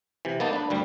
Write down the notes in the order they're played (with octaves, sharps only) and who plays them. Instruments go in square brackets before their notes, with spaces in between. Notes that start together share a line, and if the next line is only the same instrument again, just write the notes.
[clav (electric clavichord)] C3 E3
A#3 B3 D#4 A5
D4 B4
D2 G2 G3